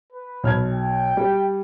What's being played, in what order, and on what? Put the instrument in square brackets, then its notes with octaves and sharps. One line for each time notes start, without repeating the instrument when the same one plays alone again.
[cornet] B4
[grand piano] B1 F6 G#6
[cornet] G5
[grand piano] G3